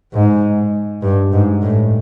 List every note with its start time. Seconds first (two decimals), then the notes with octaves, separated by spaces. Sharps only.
0.13 G#2
1.02 G2
1.32 G#2
1.62 A2